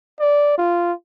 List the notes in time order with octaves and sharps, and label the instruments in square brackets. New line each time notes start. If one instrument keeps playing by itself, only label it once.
[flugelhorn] D5
F4